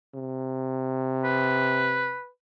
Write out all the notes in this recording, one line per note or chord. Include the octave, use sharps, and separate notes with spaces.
C3
B4